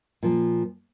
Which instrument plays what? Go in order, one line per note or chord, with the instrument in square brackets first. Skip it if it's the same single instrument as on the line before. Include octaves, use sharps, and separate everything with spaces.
[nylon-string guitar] A#2 F3